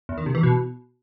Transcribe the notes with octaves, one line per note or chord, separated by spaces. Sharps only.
E2
D#3
C3
E3
B2